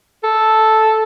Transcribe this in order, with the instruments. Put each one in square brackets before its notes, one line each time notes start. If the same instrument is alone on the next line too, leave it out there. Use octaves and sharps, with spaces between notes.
[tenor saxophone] A4